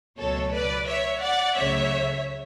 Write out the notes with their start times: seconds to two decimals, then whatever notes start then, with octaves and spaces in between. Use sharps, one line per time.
0.18 C#2 B2 F#3 A3 A4 C#5
0.52 B4 D5
0.87 C#5 E5
1.22 D5 F#5
1.57 C#2 C#3 F#3 A3 C#5 E5